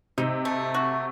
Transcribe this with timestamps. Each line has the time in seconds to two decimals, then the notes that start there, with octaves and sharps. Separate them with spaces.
0.18 C3 D#4
0.45 A3
0.74 F#4